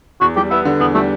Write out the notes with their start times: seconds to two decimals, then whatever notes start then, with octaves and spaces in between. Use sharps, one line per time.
0.21 E2 F#4
0.36 G3 G4
0.50 B3 E4
0.65 D3
0.80 E2 B3
0.94 G3 A3